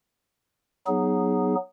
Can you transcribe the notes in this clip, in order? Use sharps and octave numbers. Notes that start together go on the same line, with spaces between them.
F#3 B3 D#4 G#4